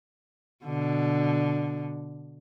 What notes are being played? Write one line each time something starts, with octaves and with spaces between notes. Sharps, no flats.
B2 D3